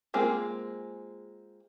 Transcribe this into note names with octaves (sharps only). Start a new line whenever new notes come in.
G#3 A#3 C4 F4 G#4